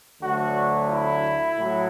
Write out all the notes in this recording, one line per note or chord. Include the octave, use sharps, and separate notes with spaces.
D2 D3 F#3 A3 F#4
E4
A2 F#3